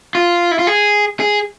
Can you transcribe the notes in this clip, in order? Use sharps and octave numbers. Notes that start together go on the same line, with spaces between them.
F4
E4
F4
G#4
G#4